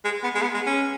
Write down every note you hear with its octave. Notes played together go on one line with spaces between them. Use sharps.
G#3
B3
G#3
B3
G#3
C#4